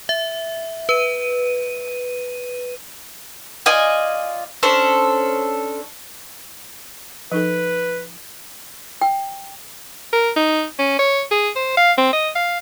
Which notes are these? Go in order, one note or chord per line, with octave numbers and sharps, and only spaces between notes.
E5
B4 D#7
F4 D5 D#5 G#5
C#4 D4 A4 C5
F3 D#4 A4 B4
G5
A#4
D#4
C#4
C#5
G#4
C5
F5
C4
D#5
F5